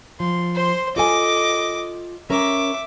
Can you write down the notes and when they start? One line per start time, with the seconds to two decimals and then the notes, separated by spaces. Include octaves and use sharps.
0.20 F3 C6
0.55 C5 C6
0.96 F4 A4 D#5 G#5 D6
2.30 C#4 A#4 E5 D6